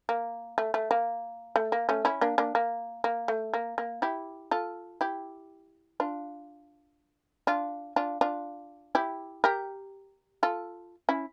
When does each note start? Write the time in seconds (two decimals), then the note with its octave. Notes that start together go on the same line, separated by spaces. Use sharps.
0.09 A#3
0.58 A3
0.74 A3
0.91 A#3
1.56 A3
1.72 A#3
1.89 A3 C#4
2.05 C#4 E4
2.21 A#3 D4
2.38 A#3 D4
2.55 A#3
3.04 A#3
3.28 A3
3.54 A#3
3.78 A#3
4.02 E4 G4
4.51 F4 A4
5.01 E4 G4
6.00 D4 F4
7.47 D4 F4
7.96 D4 F4
8.21 D4 F4
8.95 E4 G4
9.44 G4 A#4
10.43 F4 A4
11.09 C#4 E4